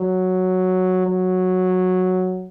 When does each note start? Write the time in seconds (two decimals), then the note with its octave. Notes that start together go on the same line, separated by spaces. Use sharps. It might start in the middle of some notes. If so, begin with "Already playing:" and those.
Already playing: F#3
1.07 F#3